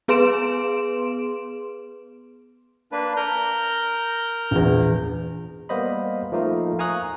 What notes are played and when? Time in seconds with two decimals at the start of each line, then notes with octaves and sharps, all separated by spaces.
0.08 B3 G#4 B4 C6 D7 E7
2.92 A#3 D4 B4
3.17 A#4 A#5 G6
4.51 A#1 E2
5.69 G3 A#3 B3 C5 D#5 B5
6.32 F3 A3 A#3 D#4 F4
6.79 F5 G#5 A#5 C#6 D#6 F#6